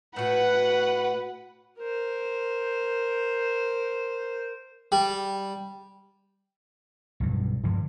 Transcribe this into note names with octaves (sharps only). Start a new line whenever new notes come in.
A2 F#4 B4 F#5
A#4 C5
G3
B1 G2
G2 D3 F3 G#3